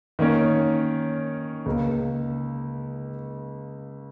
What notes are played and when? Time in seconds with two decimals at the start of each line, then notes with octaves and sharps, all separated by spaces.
0.19 D#3 A#3 C#4 A#4 C#5
1.66 C#2 C#3 A#3